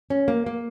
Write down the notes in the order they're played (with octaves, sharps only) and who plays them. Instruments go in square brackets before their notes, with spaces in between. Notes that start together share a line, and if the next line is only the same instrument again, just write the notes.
[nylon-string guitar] C#4
A#3
A#3